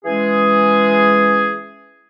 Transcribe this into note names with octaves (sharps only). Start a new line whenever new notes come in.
E3 G#3 C#4 G#4